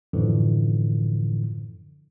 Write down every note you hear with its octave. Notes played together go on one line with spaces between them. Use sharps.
F#2 A2 D3 E3 F3